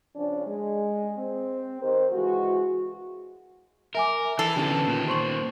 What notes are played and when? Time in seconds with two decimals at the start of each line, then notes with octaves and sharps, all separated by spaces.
0.16 C#3 F3 C#4 D4
0.47 G#3
1.17 C4
1.82 D#3 G4 A#4 C5
2.13 C#3 E3 G#3 F#4
3.95 A#4 E5 G#5 D6
4.39 E3 A4 C7
4.56 D3 E3 B3 C#4 G4
4.87 A#2 D#3
5.08 C5 C6 C#6 F#7